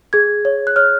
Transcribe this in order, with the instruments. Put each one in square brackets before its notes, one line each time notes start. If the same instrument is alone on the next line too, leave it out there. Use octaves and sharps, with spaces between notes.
[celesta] G#4 G#6
C#5
F#6
C#5 F6